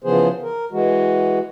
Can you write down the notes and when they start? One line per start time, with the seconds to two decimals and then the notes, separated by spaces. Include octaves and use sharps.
0.04 C#3 E3 F3 B3 G#4 C5
0.42 A#4
0.72 E3 G#3 F#4